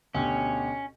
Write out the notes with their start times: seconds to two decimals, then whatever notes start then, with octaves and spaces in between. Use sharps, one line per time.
0.15 D2 B2 C#4 G4